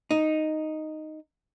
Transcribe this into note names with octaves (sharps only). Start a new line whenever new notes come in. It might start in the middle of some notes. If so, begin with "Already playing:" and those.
D#4